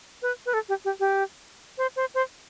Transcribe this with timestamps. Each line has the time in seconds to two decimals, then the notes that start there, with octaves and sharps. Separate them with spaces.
0.22 B4
0.46 B4
0.53 A4
0.69 G4
0.85 G4
1.00 G4
1.78 C5
1.96 C5
2.14 C5